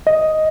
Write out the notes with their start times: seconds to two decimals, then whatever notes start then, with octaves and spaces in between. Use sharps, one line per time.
0.07 D#5